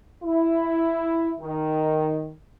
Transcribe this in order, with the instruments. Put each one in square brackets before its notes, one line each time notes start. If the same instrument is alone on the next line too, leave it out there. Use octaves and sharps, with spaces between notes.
[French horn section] E4
D#3